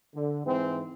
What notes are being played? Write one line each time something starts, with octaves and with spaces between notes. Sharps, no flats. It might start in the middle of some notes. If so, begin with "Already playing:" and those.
D3
G#2 E3 C4